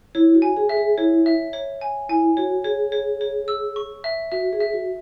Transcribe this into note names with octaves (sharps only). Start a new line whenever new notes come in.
E4 C#5
F#4
G#5
G#4
E5
G#4
E4 C#5
E5
C#5
G#5
E4 G#5
F#4 C#5
G#4 C#5
C#5
C#5
E6
C#6
E5
F#4 E5
G#4
E5
F#4